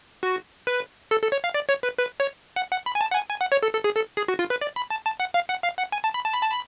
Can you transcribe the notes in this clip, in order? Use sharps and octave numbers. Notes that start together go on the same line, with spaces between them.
F#4
B4
A4
A4
C#5
F5
D5
C#5
B4
B4
C#5
F#5
F#5
B5
G#5
A5
F#5
G#5
G#5
F#5
C#5
A4
A4
G#4
A4
G#4
F#4
F4
B4
D5
B5
A5
A5
F#5
F5
F#5
F5
F#5
G#5
A5
B5
A5
B5
A5
B5